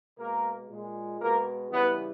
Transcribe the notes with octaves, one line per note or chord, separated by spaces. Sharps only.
B2 G#3 A#3 A#4
A#2 G#3
B2 G#3 A#3 A#4
C#3 E3 G3 B3 B4